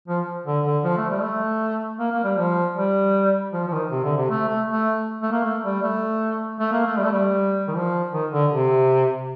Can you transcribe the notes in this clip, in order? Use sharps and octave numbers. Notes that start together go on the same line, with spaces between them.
F3
D3
D3
F3
A3
G3
A3
A#3
A#3
G3
F3
G3
F3
F3
D#3
C3
D3
C3
A3
A3
A3
A3
A#3
A3
G3
A3
A3
A#3
A3
G3
A3
G3
D#3
F3
D#3
D3
C3